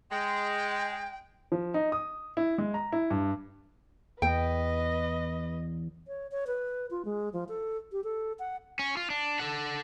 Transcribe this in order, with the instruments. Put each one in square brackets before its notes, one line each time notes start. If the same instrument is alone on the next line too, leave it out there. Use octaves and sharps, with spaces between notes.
[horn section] G#3 [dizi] G5
[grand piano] F3
D#4
D#6
E4
G#3
A#5
E4
G2
[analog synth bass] E2 [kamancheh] B4 D#5 [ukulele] G5
[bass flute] C#5
C#5
B4
F4
G#3
F3
A4
G4
A4
F#5
[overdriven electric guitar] C#4
F4
D4
A4 F#5